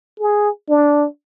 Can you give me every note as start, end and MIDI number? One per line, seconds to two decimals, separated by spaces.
0.20 0.50 68
0.69 1.05 62